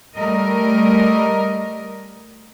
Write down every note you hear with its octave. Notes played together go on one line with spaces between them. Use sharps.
G3 A3 A#4 D#5